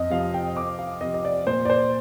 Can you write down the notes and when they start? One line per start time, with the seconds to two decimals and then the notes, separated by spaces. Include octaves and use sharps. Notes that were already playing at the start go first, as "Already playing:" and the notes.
Already playing: F2 D#5
0.10 C3 F3 F5
0.34 G5
0.56 F2 D6
0.79 F5
1.01 C3 F3 D#5
1.14 D#5
1.25 D5
1.47 A#2 C5
1.65 D5
1.70 C5